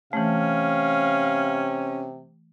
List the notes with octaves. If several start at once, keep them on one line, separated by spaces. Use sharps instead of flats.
C3 E3 A3 C#4 F5